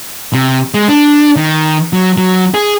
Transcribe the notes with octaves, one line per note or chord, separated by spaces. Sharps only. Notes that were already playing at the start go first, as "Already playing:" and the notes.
C3
G#3
D4
D#3
F#3
F#3
G#4